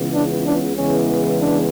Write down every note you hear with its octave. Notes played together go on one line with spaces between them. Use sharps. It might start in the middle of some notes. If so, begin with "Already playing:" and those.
Already playing: C#2 C#3 E3 B3
D4
D4
E2 C#3 E3 G#3 B3 C#4
D4